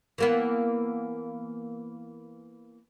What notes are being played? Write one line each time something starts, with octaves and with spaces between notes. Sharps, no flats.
E3 A#3 B3